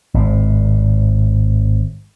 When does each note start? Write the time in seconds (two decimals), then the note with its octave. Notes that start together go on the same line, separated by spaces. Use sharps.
0.14 G#1 A2